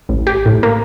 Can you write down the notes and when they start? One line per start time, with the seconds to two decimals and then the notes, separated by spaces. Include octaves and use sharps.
0.09 A1
0.27 G4
0.46 A2
0.63 A#3